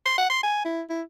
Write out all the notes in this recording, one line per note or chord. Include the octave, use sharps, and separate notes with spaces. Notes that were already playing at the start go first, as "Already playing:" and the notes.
C6
F#5
C6
G#5
E4
E4